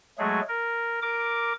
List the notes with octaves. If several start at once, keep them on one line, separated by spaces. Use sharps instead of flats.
F#3 G#3 A3 G#4
A#4
A#4 D6